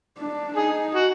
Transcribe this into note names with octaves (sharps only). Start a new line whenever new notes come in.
D4
D#4 G#4
F#4